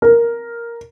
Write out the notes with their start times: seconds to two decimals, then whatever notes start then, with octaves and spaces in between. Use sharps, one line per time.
0.02 A#4